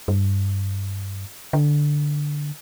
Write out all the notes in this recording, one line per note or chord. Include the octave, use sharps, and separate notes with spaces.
G2
D3